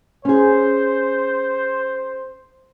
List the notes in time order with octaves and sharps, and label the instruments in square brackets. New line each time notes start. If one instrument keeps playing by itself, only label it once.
[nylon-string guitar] C#4 G#4 [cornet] C5